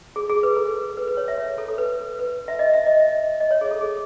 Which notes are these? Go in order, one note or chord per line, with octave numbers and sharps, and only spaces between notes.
G#4
G#4
B4
A4
B4
B4
C#5
E5
C#5
A4
A4
B4
B4
E5
D#5
E5
D#5
E5
D#5
C#5
G#4
A4
G#4